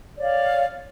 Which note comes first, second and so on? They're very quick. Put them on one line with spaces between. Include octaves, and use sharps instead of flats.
D5 C#5 F5